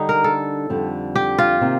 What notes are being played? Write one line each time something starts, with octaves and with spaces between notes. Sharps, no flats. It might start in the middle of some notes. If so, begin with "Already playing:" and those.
Already playing: D3 G3 D4 D#4
A#4
A4
F2 D3 G3
G4
F4
C3 D#3 A#3